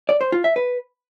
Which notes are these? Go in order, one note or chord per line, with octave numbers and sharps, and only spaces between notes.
D5
C5
F4
E5
B4